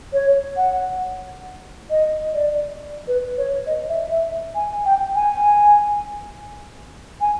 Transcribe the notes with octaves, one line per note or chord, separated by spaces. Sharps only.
C#5
F#5
D#5
D5
B4
C#5
D#5
E5
E5
G#5
G5
G#5
G#5